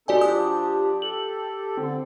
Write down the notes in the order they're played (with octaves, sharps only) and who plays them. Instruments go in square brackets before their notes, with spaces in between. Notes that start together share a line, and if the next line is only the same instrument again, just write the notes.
[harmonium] C4 D#4 A4 [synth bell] F#4 D5 G#5 [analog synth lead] G4
[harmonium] F3 D4 [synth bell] D#6
[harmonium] A4 [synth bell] F#7
[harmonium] D3 [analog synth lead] C4